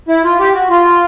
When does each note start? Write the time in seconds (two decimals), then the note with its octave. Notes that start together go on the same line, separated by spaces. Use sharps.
0.09 E4
0.24 F4
0.39 G4
0.55 F#4
0.70 F4